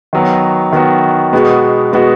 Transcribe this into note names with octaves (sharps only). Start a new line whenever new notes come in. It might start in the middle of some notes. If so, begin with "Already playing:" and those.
D#3 F#3 B3 F#4
D#3 F#3 B3 F#4
B2 G#3 B3 F#4
B2 G#3 B3 F#4